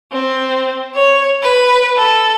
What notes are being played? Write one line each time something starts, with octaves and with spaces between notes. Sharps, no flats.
C4
C#5
B4
A4